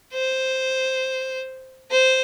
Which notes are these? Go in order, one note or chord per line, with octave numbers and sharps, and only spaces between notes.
C5
C5